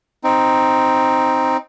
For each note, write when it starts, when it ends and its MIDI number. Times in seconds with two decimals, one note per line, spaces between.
0.24 1.57 60
0.24 1.57 63